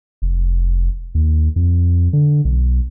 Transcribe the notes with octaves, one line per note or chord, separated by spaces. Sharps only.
F1
D#2
F2
D3
B1